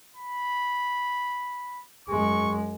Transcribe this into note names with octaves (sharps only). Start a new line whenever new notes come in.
B5
F#2 G#3 C#6